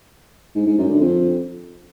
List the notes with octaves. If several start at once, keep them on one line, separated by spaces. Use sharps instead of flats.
G#2
G#2
F#2
D3
F2